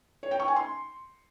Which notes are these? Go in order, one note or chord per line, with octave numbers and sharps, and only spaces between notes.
C#5
G5
C#6
G#5
C6